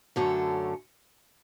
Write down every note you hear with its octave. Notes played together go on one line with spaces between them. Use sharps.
F#2 D3 A3 C#4